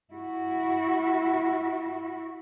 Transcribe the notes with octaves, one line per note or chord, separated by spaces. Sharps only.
E4 F#4